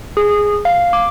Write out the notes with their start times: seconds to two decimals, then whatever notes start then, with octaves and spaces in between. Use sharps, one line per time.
0.17 G#4
0.65 F5
0.93 D6